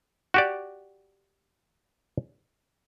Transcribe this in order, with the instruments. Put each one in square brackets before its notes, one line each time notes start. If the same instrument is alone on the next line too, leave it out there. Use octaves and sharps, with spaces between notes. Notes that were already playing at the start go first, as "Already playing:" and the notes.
[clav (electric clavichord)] F#4 G4 D5